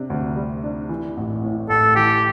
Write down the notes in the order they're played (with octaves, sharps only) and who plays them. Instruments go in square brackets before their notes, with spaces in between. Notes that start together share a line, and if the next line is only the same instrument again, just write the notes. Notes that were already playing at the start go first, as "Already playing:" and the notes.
Already playing: [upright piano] C3 D4
D2
G3
D4
E3
A1
A2
[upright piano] A1 [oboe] A4
[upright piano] E3 [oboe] G4